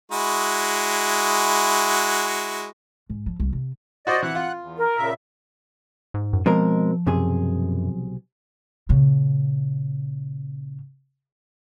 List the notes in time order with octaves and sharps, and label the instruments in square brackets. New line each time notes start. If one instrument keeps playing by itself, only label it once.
[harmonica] G#3 E4 F#4
[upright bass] G#2
F3
C2
C3
[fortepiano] F#4 C5 [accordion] D5 D#5
[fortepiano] E3 [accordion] F#5 F#6
[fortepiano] F4
[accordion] E2
[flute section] A#4
[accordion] A#2 C#3 E5
[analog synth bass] G#2
[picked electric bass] F#2
[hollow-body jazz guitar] B2 C4 A#4 [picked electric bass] F3 [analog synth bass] G#3
[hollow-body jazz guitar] B1 C3 G#4 [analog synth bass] F#2
[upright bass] A#2 C#3